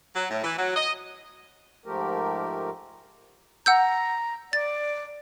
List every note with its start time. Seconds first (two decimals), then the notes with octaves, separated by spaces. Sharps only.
0.14 F#3
0.30 A2
0.43 E3
0.57 F#3
0.76 D#5
1.86 G#2 F3 A3 G4 A#4
3.66 F#5 A#5 E6 G6
4.53 D5 A6